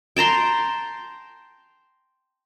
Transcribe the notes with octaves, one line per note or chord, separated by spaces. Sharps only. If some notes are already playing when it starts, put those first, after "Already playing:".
G5 A5 A#5 C6